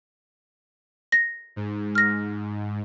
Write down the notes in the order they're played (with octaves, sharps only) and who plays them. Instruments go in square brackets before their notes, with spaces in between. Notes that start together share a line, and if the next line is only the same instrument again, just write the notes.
[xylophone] A#6
[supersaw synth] G#2
[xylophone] F6 A#6